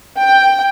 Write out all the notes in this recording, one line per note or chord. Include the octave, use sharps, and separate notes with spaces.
G5